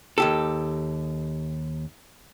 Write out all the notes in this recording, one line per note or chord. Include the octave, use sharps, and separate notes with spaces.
D#2 G4 A4